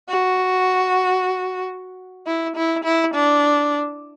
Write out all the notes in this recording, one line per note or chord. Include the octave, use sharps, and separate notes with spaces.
F#4
E4
E4
E4
D4